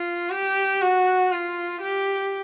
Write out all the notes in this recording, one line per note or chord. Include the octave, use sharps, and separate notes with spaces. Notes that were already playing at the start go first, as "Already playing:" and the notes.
Already playing: F4
G4
F#4
F4
G4